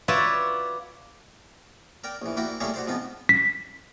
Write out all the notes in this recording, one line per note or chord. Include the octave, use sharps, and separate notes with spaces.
F4 F#4 B4 C#5 D5 E5
A#4 D5 G5
A#1 E3
A#3 E4 F#4 D5 G5
G3 A3 A#3 G4 G#4 C#5
F#4 C5 D5
G#2 F3 B3 C4
B6